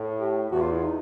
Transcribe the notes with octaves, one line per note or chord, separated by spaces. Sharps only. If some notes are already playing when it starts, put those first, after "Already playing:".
Already playing: A2
G4
E2 F#4
F4
E4
D#4